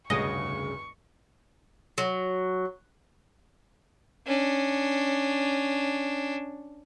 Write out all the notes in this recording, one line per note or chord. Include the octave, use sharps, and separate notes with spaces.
F1 D2 G2 C#3 D#5 C#6
F#3
C#4 D4